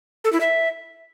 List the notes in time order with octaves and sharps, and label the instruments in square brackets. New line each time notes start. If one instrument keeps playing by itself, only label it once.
[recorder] A4
E4
E5